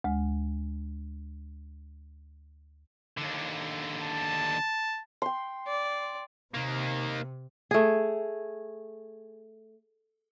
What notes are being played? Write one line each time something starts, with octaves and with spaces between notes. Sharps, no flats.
D2 G#3
D#2 D3
A5
G5 C6
D5
C3 D#3 A#3
A3 G#4